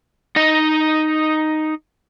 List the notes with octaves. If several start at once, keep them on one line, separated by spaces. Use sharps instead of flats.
D#4 D#5